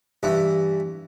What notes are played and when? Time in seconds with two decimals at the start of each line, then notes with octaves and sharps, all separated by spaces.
0.23 G2 E3